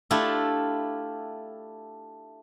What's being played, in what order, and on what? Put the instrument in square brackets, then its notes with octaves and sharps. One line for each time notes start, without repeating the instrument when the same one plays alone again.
[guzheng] A3 D4 E4 F4 G4